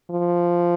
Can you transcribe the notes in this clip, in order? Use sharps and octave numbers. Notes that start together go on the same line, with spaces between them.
F3